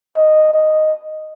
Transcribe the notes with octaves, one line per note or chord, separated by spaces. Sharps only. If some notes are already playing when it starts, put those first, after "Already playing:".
D#5
D#5